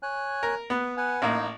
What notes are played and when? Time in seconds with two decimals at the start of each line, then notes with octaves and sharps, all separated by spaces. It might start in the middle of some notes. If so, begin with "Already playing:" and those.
0.03 C#5 G#5 F#6
0.43 A#4
0.70 B3 B4
0.97 B4 F#5 G#5
1.22 A1 A#3 D#4